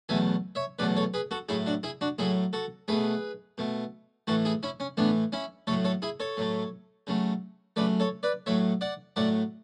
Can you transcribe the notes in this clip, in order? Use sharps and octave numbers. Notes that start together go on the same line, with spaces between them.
E2 B2 F#3 A3 E5 G#5
C#5 E5
E2 B2 F#3 A3 B4 D5
A4 C#5
G#4 B4
F#4 A4
A2 F#3 A3 E4 G#4
D4 F#4
E4 G#4
D4 F#4
A2 F#3 A3 E4 G#4
F#4 A4
B2 A3 G#4 B4
B2 A3
A2 E3 A3 F#4 A4
E4 G#4
C#4 E4
C#4
A2 E3 A3 B3 D4
C#4 E4
A2 F#3 A3 A4 C#5
A4 C#5
E4 G#4
A4 C#5
A2 F#3 A3
C#3 F#3 A3
C#3 F#3 A3 B4 D5
A4 C#5
B4 D5
A2 F#3 A3 C#5 E5
D5 F#5
A2 F#3 A3 D5 F#5